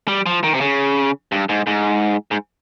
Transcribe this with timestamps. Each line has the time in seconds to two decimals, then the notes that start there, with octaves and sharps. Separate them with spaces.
0.08 G3
0.26 F3
0.44 D#3
0.54 C3
0.61 C#3
1.32 G2
1.49 G#2
1.67 G#2
2.31 G#2